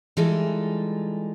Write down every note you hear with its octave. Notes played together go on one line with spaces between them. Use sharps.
E3 G3 G#3 D#4 F4 A4